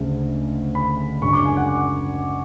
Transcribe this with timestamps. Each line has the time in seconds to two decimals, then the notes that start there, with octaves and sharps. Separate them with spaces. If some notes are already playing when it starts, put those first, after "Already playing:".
Already playing: D2 C#3 G#3
0.75 B5
1.22 F#2 C#3 G#3 D4 C#6
1.33 D6
1.45 G#5
1.57 F#5
1.69 F#5